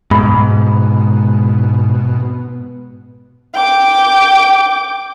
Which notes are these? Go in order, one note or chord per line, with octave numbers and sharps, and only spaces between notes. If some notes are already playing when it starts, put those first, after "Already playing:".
G#2 B2 B5
G5 D6